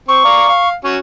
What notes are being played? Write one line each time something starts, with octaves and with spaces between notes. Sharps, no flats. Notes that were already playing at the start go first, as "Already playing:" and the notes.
C4 C#6
D5 F5 A#5
F5
C#4 F#4